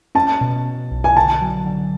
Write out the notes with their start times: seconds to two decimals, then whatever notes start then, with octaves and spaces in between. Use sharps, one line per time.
0.15 C#4 A5
0.41 B2
0.65 B2
0.91 B1
1.04 G#5
1.16 D3 A5
1.41 F#3
1.66 D3